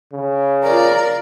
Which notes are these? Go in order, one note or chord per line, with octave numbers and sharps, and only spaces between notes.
C#3
F4 A#4 D5